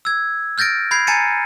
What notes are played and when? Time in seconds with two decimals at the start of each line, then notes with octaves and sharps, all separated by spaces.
0.05 E6 G#6
0.58 F6 G6 A6 A#6 D7
0.91 B5 G6 G#6 C7
1.07 G#5 A#5 A6 C#7 D#7